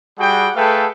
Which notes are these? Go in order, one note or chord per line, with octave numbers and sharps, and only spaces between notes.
G3 F#4 G#4 F#5 G5
A3 G#4 A4 B4 F5 G5